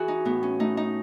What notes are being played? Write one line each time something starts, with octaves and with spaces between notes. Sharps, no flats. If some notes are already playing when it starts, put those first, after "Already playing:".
Already playing: E3 F#4 G#4
D#4
A2 B3
C#4
A3 D#4
D#4